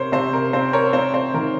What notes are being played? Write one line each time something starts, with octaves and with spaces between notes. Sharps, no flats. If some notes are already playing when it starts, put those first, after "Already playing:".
Already playing: C3 A#4 C5 C#5
C3 C5
A#4
C4 C5
A#4 C#5
C4 C5
C5
D#3 A#4